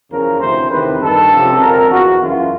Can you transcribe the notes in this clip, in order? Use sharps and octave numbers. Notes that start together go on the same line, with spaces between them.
E2 C#3 F3 A#4
D2 C3 E3 C5
E2 C3 D#3 B4
G2 D#3 A4
C#2 C3 F3
F2 D3 F3 A#4
E2 B2 F#4
F#2 C#3 E3 F4